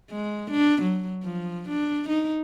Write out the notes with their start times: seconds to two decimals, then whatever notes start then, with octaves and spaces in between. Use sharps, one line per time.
0.11 G#3
0.51 D4
0.82 F#3
1.23 F3
1.69 D4
2.09 D#4